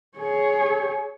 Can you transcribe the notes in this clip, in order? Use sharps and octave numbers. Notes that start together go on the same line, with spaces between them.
G#4 C#5